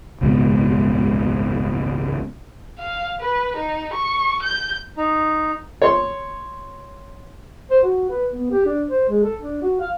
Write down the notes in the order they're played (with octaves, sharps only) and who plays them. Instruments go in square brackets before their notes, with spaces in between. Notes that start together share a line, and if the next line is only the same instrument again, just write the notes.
[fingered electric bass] F#1 C#2 G#2 B2
[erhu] F5
B4
D#4
C#6
G6
[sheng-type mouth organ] D#4
[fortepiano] C#5 C6
[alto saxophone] C5
F#4
B4
B3
G4
D4
C5
G#3
A4
D4
F#4
F5